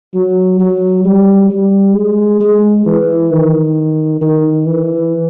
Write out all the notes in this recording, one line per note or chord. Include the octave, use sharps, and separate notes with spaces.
F#3
F#3
G3
G3
G#3
G#3
E3
D#3
D#3
E3